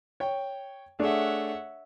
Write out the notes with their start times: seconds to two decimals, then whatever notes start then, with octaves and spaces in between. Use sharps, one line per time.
0.20 C#5 G5
0.99 A3 D4 G#4 C#5 E5 F#5